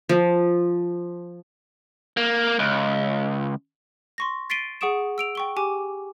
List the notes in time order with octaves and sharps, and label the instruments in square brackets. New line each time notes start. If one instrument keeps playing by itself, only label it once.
[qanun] F3
[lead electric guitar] A#3
C#2
[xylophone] C6 C#6 A#6
A6 B6 C7 D7 D#7 G7
G#4 F#5 C#6 D#6 D7 E7
E6 D7 F7
G5 C#6 G7
G4 G#5 D6